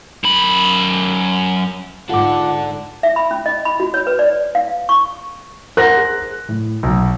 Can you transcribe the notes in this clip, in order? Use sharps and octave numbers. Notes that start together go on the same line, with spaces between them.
F#2 B5
G#2 D4 F4 A4 F#5 D6
E5
B5
C#4
D#5
B5
F#4
C#5
B4
D5
F5
C#6
A#4 C5 F#5 F#6 A#6
G#4
A2
B1